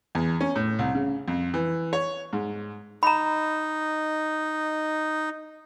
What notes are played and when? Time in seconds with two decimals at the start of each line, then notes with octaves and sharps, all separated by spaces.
0.15 E2
0.41 C#4
0.56 A2
0.79 C2
0.95 C#3
1.28 F2
1.54 E3
1.93 C#5
2.33 G#2
3.03 D#4 A#5 B5